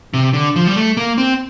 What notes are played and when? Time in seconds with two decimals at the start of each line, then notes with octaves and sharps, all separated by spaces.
0.14 C3
0.33 D3
0.56 F3
0.67 G3
0.76 A3
0.97 A#3
1.18 C4